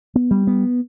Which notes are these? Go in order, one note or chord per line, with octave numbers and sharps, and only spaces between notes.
B3
G3
B3